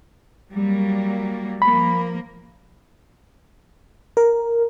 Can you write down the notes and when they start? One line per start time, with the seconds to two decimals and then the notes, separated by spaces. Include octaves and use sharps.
0.53 F#3 G3 A#3
1.62 F3 A#3 B5
4.17 A#4